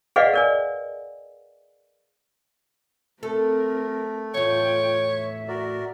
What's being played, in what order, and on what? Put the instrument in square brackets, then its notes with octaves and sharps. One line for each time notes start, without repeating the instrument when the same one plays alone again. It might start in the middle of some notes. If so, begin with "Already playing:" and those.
[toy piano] G#4 B4 D5 D#5 F5 F#5
A#4 D5 G#5
[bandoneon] A3 [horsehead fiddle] C4 A#4 [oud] A4
[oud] E2 A2 [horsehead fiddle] F4 G5 [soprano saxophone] C#5
[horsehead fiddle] E5
[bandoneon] F#4 A#4 D5